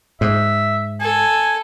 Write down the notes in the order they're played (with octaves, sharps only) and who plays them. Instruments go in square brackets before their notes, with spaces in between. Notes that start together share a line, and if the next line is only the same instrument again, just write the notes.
[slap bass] G#2 [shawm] E5
[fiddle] A4 [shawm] G#5